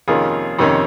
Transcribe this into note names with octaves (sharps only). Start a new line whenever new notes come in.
F2 C3 D#3 A#3 C#4 F4 G#4
F2 C3 D#3 A#3 C#4